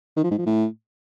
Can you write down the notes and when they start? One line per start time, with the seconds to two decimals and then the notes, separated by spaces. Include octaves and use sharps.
0.16 D#3
0.24 F3
0.31 G#2
0.38 F3
0.46 A2